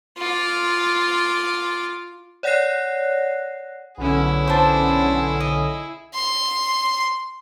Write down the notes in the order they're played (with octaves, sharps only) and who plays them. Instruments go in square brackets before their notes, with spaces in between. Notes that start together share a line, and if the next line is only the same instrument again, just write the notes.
[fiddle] F4 D6
[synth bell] C#5 D5 F#5 F#6 A#6 C7
[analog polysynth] B1 D3 C#4 [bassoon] B3 [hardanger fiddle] E4 G#4
[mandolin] D4 C5
D#5
[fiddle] C6